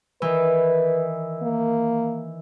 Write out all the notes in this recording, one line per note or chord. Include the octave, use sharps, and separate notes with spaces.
D#3 E3 B4
A#3